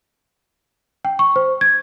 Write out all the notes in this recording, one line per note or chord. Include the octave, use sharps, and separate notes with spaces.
G5
C#6
C5
G#6